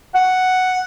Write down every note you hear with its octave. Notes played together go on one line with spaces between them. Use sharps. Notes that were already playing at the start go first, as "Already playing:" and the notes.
F#5